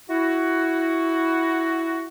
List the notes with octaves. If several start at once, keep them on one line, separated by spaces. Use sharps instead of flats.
E4 F#4